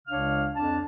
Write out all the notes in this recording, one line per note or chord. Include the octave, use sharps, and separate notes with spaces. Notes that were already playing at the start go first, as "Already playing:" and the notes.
C#2 C#3 D4 C#5 F5 F6
F2 D4 A5